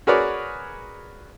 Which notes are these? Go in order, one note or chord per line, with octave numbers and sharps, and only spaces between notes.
F#4 G#4 A#4 B4 C#5 D5